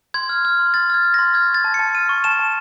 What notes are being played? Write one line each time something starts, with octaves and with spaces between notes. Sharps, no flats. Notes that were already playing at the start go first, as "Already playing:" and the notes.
C6 G#6
F6
F6
C6
C6 A6
F6 G#6
F6
A#6
C6
F6 G#6
C#6
A6
A5
C#7
A5
F6 D#7
C#6
A5 E7
A5